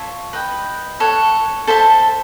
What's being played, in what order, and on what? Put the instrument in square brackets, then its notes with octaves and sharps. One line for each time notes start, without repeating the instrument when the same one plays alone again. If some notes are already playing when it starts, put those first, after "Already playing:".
Already playing: [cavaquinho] F4 A4 C#5 E5
B4 D#5 G5
A4 C#5 F#5
A4 C5 E5 A5